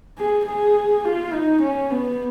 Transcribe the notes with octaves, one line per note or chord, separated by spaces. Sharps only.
G#4
G#4
F4
D#4
C#4
B3